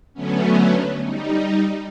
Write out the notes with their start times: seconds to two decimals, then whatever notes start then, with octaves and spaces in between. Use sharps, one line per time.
0.14 D3 F#3 A3 B3 C#4
1.01 G3 D#4